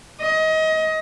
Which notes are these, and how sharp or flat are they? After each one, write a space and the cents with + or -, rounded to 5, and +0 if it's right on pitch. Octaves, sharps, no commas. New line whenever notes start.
D#5 +25